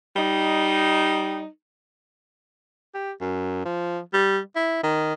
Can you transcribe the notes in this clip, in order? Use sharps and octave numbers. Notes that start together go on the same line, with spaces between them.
G3 D#4
G4
F#2
F3
G3
E4
D#3